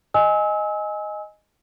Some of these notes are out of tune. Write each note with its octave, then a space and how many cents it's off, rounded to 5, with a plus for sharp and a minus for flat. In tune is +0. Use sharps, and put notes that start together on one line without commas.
D#5 +0 G#5 +0 E6 -35